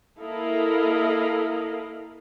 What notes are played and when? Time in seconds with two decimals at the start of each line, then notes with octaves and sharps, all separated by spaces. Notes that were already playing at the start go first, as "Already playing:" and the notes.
0.21 A#3 E4 A4 A#4 D#5 F5